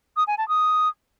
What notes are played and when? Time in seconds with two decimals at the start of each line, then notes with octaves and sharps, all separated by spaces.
0.17 D#6
0.27 G#5
0.38 A5
0.48 D#6